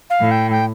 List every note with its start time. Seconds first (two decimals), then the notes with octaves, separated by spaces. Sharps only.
0.10 F5
0.20 A2
0.31 G5
0.51 G5